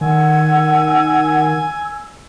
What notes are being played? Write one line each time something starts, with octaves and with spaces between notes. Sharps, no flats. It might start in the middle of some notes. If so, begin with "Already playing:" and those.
D#3 F#5 G#5 E6